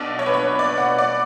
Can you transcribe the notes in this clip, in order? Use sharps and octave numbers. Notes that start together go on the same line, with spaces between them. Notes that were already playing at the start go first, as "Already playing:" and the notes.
Already playing: B1 B2 D4
C#5
B4
C#5
D5
F#5
D5